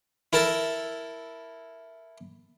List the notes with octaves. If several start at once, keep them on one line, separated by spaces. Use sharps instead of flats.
E4 A4 A#4 A5